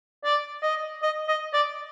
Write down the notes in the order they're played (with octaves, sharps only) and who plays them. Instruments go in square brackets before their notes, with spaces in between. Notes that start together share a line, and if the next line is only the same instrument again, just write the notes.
[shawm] D5
D#5
D#5
D#5
D5